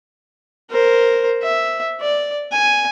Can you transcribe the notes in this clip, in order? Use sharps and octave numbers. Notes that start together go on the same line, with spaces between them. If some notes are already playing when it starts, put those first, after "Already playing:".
A#4 C5
E5
D5
G#5